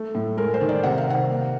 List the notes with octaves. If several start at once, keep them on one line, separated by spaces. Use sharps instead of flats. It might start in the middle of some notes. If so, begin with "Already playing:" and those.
Already playing: A3
A2
G#3 A#4
C5
D#3
D5
C3 F#5
F5
C3 F#5
A#3